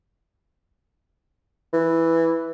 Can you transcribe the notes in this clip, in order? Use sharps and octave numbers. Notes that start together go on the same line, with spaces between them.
E3